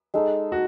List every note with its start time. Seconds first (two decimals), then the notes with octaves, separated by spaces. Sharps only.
0.14 G#3 D#4 A4
0.52 F#4